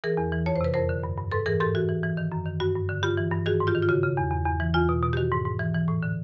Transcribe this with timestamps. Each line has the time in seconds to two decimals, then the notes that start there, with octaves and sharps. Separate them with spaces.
0.04 E3 G#4 A#4
0.17 E2
0.32 E3
0.46 F2 C#5
0.56 C5
0.61 C3 B4
0.74 F2 A#4 C5
0.89 D3
1.03 G2
1.18 G2
1.32 G#2 A4 B4
1.46 E3 G#4 A#4
1.60 G#2 G4 A4
1.75 E3 F#4
1.89 E3
2.03 E3
2.17 D#3
2.32 F#2
2.46 D#3
2.60 G2 F#4
2.75 G2
2.89 D3
3.03 G2 F4 G4
3.17 E3
3.32 G2
3.46 D#3 F#4 G#4
3.60 G#2
3.67 F4 G4
3.75 D#3
3.83 F4
3.89 C#3 F#4
4.03 C#3
4.17 E2
4.31 E2
4.45 E2
4.60 E3
4.74 E2 F4
4.89 B2
5.02 B2
5.13 G4
5.17 D#3 F#4
5.32 G#2
5.45 G#2
5.59 E3
5.74 E3
5.88 A2
6.03 D3